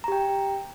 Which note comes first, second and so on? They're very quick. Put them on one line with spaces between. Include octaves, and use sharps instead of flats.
A#5 G4 G5